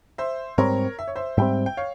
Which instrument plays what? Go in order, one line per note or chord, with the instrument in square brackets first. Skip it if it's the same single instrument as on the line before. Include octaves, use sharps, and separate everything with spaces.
[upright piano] C5 E5
[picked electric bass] G#2 G3 C4 [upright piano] A#4 C#5
[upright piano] E5
C#5
C5 E5
[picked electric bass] G#2 G3 C4 [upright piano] E5 G5
[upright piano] G5
C#5 F5